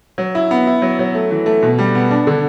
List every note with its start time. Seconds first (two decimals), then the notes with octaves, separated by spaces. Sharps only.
0.18 F#3
0.35 E4
0.51 B3
0.67 E4
0.82 F#3
0.99 F#3
1.15 A3
1.31 E3
1.46 A3
1.63 B2
1.79 G3
1.95 B3
2.11 D4
2.27 D3